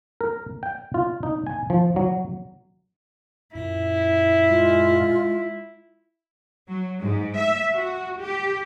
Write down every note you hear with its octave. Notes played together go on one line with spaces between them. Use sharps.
A#4
G5
F4
D#4
G#5
F3
F#3
F#2 A#2 E4
G#3 F4
F#3
G#2
E5
F#4
G4